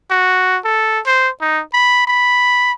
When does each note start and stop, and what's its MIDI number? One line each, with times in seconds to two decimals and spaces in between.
0.11 0.58 66
0.64 1.00 69
1.06 1.29 72
1.41 1.62 63
1.73 2.03 83
2.07 2.72 83